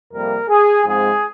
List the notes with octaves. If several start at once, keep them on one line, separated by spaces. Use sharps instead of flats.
F2 C3 G3 A#3 A#4
G#4
G#2 F3 G#3 C4 G#4